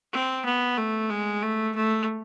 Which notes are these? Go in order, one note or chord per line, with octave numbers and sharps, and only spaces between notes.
C4
B3
A3
G#3
A3
A3